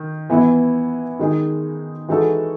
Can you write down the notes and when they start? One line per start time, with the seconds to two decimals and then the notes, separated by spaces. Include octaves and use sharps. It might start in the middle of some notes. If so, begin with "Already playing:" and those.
Already playing: D#3
0.30 E3 B3 E4
1.19 D#3 G#3 D#4 G#4
2.08 E3 G#3 D#4 F#4 A4